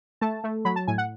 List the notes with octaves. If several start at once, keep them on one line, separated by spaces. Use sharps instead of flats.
A3 A5
A3
F#3 B5
A5
A2 G#5
F#5